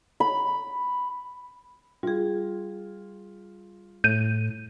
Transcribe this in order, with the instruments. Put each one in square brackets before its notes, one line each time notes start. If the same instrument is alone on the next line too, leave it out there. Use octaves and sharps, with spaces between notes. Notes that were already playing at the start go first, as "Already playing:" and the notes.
[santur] B5
[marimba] G3 G#4 [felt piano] F4
[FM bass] A2 [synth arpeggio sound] G6 D#7